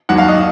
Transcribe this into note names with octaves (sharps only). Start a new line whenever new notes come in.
D#2 D#3 F#3 F#5
F5
D#5